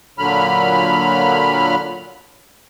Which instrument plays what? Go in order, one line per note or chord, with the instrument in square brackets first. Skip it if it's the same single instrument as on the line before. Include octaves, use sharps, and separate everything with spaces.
[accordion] A#2 D3 F#3 B5 F6